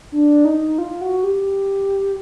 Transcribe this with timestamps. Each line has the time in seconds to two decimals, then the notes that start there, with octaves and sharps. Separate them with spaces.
0.12 D4
0.45 D#4
0.78 F4
1.01 F#4
1.24 G4